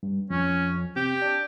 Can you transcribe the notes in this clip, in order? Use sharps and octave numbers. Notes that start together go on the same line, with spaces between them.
G2
F2 C#4
C3 G4
D4